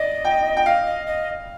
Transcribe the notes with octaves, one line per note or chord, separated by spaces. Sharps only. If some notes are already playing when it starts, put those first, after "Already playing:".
Already playing: D5 D#5
G5
G5
D#5 F5
D#5
D#5